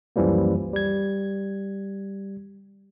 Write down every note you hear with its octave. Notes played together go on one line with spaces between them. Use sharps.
C#2 F#2 E3 F3 G3 A#3
G3 G#6